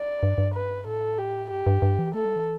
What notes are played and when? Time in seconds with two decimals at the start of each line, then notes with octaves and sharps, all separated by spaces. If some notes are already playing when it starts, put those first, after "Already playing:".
Already playing: D5
0.23 G2
0.38 G2
0.54 B4
0.86 A2 A4
1.18 G4
1.50 G2 G4
1.67 G2
1.82 G2
1.99 E3
2.14 A3 A4
2.25 G3
2.36 E3